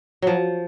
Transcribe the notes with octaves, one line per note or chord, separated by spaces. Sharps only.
F3 F#3